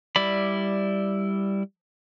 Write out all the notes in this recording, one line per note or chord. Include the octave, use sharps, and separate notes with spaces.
G3 E4 D5 B5